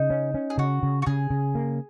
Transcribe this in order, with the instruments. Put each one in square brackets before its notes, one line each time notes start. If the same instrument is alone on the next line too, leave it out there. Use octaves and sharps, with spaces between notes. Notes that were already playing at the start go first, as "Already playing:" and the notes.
Already playing: [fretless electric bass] C#3 [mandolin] D#4
[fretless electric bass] C#4
C#4
[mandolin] G#4
[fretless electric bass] C#3 [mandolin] F#4
[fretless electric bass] C#3
[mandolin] F#4
[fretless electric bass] C#3 [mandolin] G#4
[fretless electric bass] C#3
A#3